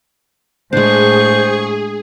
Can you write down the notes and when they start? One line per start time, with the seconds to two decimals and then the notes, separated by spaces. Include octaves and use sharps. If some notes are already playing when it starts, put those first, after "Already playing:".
0.73 A2 G#3 D4 G#4 C5 C#6